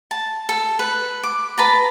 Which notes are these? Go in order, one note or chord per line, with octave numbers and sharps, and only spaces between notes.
A5
A4
B4
D6
B4 A5 A#5